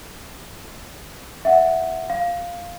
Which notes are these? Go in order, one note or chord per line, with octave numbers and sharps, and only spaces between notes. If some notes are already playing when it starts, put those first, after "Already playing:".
E5 F#5
F5